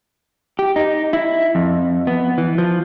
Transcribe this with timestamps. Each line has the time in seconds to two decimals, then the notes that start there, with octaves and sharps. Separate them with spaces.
0.59 G4
0.76 D#4
1.13 E4
1.55 F2
2.07 B3
2.38 E3
2.58 F3